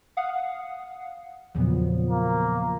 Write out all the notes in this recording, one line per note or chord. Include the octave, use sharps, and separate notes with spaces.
F5 F#5 D#6
E2 A#2 C#3 F3 F#3 B3
A#3